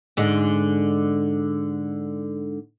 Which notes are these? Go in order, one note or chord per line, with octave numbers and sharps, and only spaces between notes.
G#2 D3 G#3